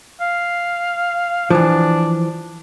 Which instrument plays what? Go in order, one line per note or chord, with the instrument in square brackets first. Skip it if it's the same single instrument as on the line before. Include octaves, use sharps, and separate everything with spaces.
[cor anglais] F5
[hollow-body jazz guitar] E3 F3 [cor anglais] D4